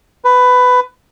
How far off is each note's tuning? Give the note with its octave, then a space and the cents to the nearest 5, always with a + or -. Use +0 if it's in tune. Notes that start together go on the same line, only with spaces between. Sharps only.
B4 +15